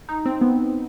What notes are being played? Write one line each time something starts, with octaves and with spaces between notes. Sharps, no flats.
D#4
C4
B3